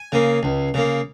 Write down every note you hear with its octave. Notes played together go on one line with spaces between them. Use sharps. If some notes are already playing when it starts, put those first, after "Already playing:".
Already playing: G#5
C#3 A#3
C#2
C#3 A#3